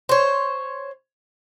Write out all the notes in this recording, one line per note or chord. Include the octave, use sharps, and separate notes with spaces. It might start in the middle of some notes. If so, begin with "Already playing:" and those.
C5 C#5